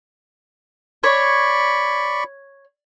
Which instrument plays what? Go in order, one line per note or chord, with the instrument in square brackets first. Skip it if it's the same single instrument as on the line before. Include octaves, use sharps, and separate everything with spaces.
[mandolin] C#5 [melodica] D5 B5 C#6